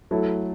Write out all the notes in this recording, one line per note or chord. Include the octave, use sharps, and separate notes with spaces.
F#3 A3 E4 A4